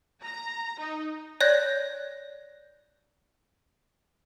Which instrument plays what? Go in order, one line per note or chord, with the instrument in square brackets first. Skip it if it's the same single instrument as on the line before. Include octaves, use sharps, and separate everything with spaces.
[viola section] A#5
D#4
[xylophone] C#5 D5 F#6 G6 A#6